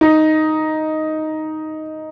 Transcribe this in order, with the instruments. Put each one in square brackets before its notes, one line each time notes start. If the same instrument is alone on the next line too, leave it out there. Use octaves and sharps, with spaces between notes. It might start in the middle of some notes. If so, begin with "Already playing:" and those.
[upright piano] D#4